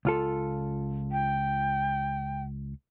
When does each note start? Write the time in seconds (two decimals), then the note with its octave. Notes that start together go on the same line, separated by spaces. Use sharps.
0.05 C#2 F4 A4
1.12 G5